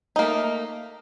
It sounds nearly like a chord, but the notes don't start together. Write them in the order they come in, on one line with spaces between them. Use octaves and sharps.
D#4 A#3 A3